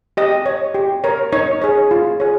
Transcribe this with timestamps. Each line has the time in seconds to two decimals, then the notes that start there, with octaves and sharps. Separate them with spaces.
0.17 G4 D#5
0.46 C#5
0.74 G4
1.04 A#4 C#5
1.33 D#4 C#5
1.62 G#4 C#5
1.91 F4
2.20 G#4 C#5